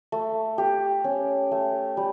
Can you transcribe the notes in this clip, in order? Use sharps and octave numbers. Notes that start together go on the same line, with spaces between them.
A3
G4
C#4
A3
G3